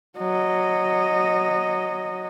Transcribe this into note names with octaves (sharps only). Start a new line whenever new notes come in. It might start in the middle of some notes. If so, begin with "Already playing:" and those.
F#3 D#5